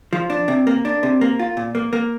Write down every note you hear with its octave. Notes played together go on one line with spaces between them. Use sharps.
F3
D4
C3
A#3
D4
C3
A#3
F4
A#2
A#3
A#3